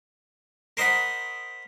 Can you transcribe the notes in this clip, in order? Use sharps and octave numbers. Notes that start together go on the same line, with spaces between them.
A#4 C5 D#5 F#5 B5